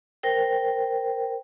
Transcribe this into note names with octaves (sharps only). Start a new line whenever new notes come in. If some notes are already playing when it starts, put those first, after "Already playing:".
A#4 C5 G5